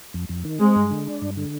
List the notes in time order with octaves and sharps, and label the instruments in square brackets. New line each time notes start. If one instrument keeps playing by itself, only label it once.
[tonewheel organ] F2
F2
D#3
[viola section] G#3 [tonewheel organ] C4
[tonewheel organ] G2
D3
D4
G2
D3